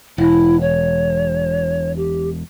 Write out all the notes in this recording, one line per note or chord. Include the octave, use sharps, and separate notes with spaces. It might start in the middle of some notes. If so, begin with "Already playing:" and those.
E1 E4
C#5
G4